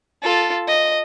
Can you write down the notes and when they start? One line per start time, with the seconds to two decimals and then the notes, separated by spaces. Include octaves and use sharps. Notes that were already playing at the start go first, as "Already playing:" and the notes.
0.23 F4 A4
0.68 D#5